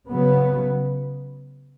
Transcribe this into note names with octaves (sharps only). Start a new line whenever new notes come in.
C#3 F#3 B3